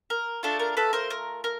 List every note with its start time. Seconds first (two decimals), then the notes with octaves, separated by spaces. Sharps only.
0.10 A#4
0.43 A3 D4 F4 A4
0.59 A#4
0.77 A4 B4
0.93 A#4 C5
1.10 A#4
1.44 A#4